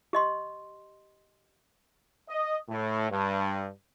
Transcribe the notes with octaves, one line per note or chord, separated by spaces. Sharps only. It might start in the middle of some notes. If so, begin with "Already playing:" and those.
G4 D#5 C6
D#5
A2
G2